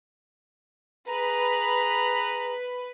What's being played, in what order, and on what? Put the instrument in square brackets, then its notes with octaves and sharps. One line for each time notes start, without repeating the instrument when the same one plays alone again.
[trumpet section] G#4 A#5 [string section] B4